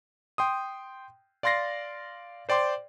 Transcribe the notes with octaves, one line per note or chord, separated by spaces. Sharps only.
G5 C6 D#6
D5 F5 C6 A6 A#6 C7
C5 D5 G5 C6 D6